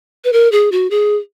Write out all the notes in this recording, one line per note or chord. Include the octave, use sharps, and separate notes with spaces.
B4
A#4
G#4
F#4
G#4